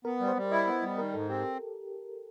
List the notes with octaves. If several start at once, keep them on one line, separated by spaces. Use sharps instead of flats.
B3 A#4
G3
C5
G3
E4 D#5
B3
G3
D#3 A#4
G#2 A4
C4 G4